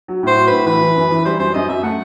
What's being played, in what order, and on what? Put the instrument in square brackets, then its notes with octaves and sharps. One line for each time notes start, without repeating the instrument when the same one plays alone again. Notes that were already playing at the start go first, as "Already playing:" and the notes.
[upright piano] F#3
[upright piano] A2 [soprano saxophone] C5
[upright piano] F#3
[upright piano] A2 [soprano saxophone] B4
[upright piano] E3 [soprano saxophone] B4
[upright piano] E3
F#2
E3
[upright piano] G3 [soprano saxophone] C5
[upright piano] F#2 [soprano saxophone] C5
[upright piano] F#2 [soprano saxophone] D#5
[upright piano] F#2 [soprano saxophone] E5
[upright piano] A3 [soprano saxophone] F#5